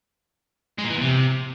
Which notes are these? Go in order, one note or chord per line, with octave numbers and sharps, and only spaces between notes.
G#3
A#2
E3
E2
C3